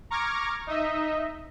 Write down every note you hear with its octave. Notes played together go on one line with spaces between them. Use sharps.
A#5 C#6 D6 F6 G#6 A#6
D#4 D#5 E5